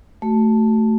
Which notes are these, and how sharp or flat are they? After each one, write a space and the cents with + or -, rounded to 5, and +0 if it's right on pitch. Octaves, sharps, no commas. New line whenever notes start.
A3 +0 F#4 +30